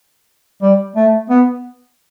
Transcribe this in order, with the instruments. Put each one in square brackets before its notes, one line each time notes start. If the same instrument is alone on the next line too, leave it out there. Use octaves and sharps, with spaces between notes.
[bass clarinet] G3
A3
B3